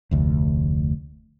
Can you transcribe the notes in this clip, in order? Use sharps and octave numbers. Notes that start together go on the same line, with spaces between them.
F1 D2